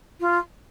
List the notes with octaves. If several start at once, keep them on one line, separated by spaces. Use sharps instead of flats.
F4